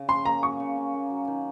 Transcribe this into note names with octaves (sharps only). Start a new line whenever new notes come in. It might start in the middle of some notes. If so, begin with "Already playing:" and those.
Already playing: C#3
C#4 C6
A#3 A#5
F#3 C#6
C#3
C#4
A#3
F#3
D#3